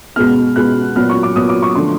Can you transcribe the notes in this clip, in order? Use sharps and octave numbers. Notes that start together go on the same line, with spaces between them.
B2 G#3 B3 F6
B2 G#3 B3 F#6
A#2 F#3 B3 F6
C#6
D6
A#2 F#3 B3 D#6
D6
C#6
D3 F3 A3 C6